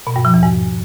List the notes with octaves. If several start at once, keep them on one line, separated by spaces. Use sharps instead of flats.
B2
G2
F3
E2
G#2